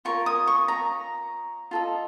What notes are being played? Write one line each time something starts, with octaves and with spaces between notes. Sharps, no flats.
F4 A#4 C#5 C#6
D#6
C#6
A#5
F4 A4 D#5